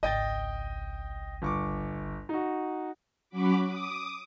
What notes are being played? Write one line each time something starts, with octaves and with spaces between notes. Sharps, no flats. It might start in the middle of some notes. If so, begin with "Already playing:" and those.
G#1 C#2 D#5 G5 A6
G1 C#6 D6
D#4 F#4
F#3 C#4 F#4 B5 D6
D6 D#6